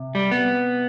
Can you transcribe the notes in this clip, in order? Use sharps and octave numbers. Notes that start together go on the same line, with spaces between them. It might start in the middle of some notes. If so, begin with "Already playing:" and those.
Already playing: C3
G3
B3